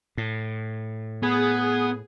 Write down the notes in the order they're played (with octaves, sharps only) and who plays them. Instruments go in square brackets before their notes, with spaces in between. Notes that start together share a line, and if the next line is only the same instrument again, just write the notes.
[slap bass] A2
[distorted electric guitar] B3 [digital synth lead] G#4